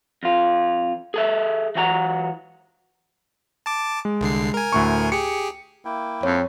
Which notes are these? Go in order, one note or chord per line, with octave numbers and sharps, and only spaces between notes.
F2 F4
G#4 A4 E5
E3 F#3 F#4 G#5 A#5
A5 D6
G#3
C2 D3 C7
A#4 G#5
D2 A2 C#6
G4 G#4 C#7
A#3 E4 G5
F2 C#5